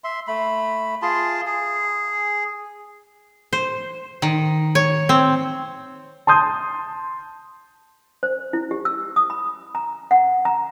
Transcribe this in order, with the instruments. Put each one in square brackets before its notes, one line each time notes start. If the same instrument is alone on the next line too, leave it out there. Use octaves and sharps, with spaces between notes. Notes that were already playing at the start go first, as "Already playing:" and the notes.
[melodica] E5 C6
A3 B5
F4 G#4 A5 C6
G#4
[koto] C5
D#3
C#5
C4
[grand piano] A5 C6 D#6 G6
[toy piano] C5
E4
G4
E6
D#6
B5
A#5
F#5
A#5